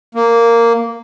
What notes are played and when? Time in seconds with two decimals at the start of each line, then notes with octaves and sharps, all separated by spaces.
0.15 A#3